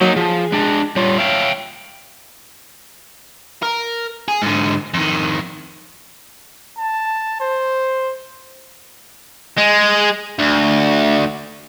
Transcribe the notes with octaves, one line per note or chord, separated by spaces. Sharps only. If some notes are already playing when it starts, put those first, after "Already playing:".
F#3 A#3 D#4
F3 G#4
G#3 D4
G3 F4 C#5
C#5 E5 F5 G5
A#4
G#4
G#2 D3
F2 D#3
A5
C5
G#3
D2